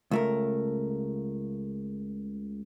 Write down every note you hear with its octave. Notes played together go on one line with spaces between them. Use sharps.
C#2 A3 A#4